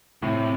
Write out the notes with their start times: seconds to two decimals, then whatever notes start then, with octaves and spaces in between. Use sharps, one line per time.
0.22 A2 C3